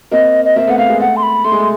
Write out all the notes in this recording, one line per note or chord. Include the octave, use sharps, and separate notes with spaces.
A#3 C4 D#5
D#5
A#3 C4 E5
A3 B3 F#5
A3 F5
G#3 A#3
A3 F#5
C6
B5
A3 C6
G#3
A3